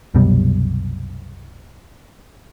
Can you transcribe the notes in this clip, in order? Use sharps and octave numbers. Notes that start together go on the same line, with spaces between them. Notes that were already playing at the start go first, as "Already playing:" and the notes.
C2 F#2 B2 G3